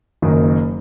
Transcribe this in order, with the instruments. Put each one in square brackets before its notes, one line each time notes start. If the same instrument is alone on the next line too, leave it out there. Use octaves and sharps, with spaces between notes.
[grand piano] F#1 F#2 D#3